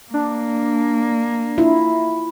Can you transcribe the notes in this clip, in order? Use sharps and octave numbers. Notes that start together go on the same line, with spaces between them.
A#3 D4
E4 F4